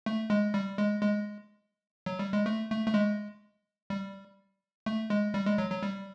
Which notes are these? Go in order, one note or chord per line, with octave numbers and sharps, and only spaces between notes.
A3
G#3
G3
G#3
G#3
F#3
G3
G#3
A3
A3
A3
G#3
G3
A3
G#3
G3
G#3
F#3
F#3
G3